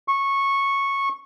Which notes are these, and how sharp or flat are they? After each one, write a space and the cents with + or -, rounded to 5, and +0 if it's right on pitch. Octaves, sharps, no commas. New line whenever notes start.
C#6 -10